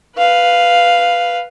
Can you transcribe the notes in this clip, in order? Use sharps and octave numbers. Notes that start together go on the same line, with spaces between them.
B4 F5